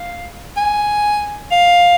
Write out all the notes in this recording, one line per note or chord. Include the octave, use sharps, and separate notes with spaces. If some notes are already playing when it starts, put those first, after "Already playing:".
Already playing: F5
G#5
F5